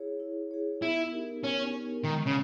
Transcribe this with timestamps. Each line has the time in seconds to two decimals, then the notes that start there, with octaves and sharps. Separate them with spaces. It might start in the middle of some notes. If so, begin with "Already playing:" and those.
Already playing: E4 G#4 C#5
0.20 E4
0.51 G#4 C#5
0.81 B3 E4
1.12 D#4 G4 A#4
1.43 B3 C#4
1.74 D#4 G4 A#4
2.04 D#3 G#3
2.27 C#3